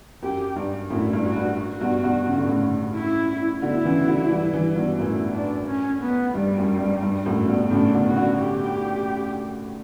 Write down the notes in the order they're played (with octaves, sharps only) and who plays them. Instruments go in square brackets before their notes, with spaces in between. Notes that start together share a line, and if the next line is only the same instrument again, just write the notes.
[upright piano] F#2 [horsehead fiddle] G4
[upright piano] G2
[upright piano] F#2 A2 [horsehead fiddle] E4
[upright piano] G2
[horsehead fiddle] F#4
[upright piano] G2
[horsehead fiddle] F#4
[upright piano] G2 B2
G2 B2
C#3
D3
A2 C#3
[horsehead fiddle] E4
[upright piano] B2 D3 [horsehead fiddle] E4
[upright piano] C#3 E3
D3 F#3
E3 G3
E3 G3
G2 B2
[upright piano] F#2 A2 [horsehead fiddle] E4
[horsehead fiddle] D4
C#4
B3
[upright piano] G2 [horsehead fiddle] G3
[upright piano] F#2
G2
G2
F#2 A2
G2 B2
B2
[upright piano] A2 C#3 [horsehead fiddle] D4
[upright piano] B2 D3
[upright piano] C#3 [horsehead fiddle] F#4
[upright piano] B2 D3
[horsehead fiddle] G4